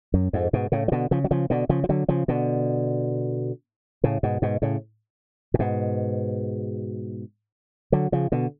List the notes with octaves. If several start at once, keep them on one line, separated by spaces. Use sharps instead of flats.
F#2
F2 G#2
G#2 B2
A2 C#3
F3
B2 D3
C#3 F3
F#3
C#3 F3
B2 D3
C#3 F3
F3
D3 F#3
C#3 F3
B2 D3
A2 C#3
G#2 B2
G#2 B2
A2 C#3
A2
G#2 B2
D3 F#3
C#3 F3
B2 D3